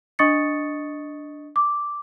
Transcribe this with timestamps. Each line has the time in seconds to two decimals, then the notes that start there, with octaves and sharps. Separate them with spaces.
0.19 D4 D#5 C#6 D#6 A6 C#7
1.56 D6